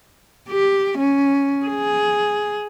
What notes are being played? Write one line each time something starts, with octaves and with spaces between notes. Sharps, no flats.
G4
C#4
G#4